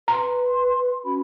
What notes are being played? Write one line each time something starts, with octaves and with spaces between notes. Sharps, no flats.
B4 A#5 C6
C#4 F#4 B5